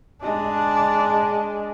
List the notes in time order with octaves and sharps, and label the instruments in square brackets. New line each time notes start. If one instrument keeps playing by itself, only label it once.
[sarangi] G#3 [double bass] D4